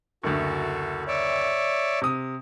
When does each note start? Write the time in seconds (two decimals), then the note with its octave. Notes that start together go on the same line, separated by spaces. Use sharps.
0.23 F#1 D2 F#4 A4
1.08 C#5 D5 E5
2.01 C3 D#6